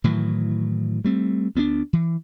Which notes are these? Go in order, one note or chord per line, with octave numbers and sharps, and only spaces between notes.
A2 D#3 E3 F#3
G3 A3 C4
D2 B3 C4 D4
E3